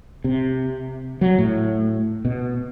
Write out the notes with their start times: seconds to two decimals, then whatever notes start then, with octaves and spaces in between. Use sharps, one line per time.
0.24 C3
1.21 F#3
1.38 A2
2.25 B2